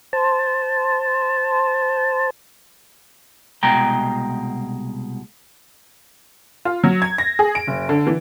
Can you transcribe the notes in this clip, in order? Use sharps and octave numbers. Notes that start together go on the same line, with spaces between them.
C5 A5
C2 B2 G#3 G5 A#5
F4
F#3
G#6
A#6
G#4
D7
F#1
D3
E3